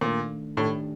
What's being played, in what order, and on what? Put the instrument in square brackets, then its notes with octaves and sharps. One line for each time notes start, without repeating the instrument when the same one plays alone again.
[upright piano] A#2 [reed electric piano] D#3 A3 D4
[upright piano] A2 [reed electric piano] D#3 A3 D4 G4